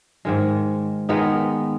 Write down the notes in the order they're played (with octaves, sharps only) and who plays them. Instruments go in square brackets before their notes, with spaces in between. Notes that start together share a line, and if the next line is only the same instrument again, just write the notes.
[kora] G#2 D#3 G#3
D#3 G#3 B3 D#4